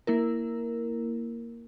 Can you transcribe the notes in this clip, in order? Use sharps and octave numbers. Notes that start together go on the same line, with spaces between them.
A#3 E4 A#4